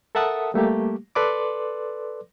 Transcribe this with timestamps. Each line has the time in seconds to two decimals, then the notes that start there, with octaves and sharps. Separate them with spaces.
0.15 A4 A#4 E5 F#5 A5 D#6
0.54 G3 A3 A#3 G4
1.15 A4 B4 D5 C6 D6